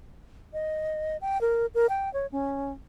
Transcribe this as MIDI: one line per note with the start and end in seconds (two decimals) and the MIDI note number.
0.53 1.17 75
1.21 1.40 79
1.41 1.66 70
1.75 1.87 70
1.89 2.12 79
2.14 2.27 73
2.32 2.73 61